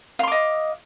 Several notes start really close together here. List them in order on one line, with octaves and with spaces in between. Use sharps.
F5 C6 D6 D#5